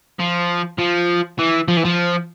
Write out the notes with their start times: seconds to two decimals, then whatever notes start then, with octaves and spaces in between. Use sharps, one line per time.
0.20 F3
0.79 F3
1.39 E3
1.68 F3
1.77 E3
1.85 F3